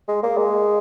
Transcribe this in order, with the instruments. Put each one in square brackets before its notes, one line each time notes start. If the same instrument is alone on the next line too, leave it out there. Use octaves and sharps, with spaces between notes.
[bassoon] G#3
A#3
G#3